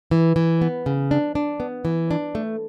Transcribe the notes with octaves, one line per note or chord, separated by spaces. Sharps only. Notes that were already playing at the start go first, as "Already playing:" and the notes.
E3
E3
B3
C#3
D4
D4
B3
E3
D4
A3